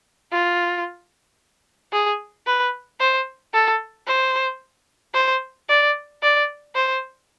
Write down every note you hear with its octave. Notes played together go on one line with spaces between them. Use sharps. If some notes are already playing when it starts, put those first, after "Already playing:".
F4
G#4
B4
C5
A4
C5
C5
D5
D5
C5